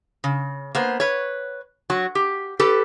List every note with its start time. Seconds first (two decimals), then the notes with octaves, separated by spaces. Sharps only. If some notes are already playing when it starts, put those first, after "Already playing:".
0.24 C#3
0.75 A#3 B3 C5
1.00 B4 C#5
1.90 F#3 F#4
2.15 G4
2.59 G4 A4 B4